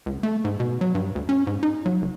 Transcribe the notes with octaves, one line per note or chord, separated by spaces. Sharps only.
C#2
A3
G#2
B2
F#3
G2
D2
C#4
G#2
D#4
F#3
F#1